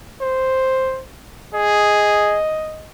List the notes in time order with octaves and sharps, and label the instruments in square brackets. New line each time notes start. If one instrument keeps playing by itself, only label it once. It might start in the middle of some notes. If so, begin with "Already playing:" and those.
[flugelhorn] C5
[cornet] G#4 [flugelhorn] D#5